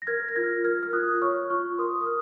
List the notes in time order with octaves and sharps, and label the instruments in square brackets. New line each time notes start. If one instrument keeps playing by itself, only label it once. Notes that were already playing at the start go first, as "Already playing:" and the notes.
[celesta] A#6
A#4 F6 G#6
A#6
F4 F6 G#6
A#4 F6 G#6
F6
F4 D#6 F#6
C#5 C#6 F6
F4 C#6 F6
A#4 C6 D#6
D#6
A#4 F6